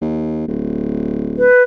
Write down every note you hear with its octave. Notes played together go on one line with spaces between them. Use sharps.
D#2
D1
B4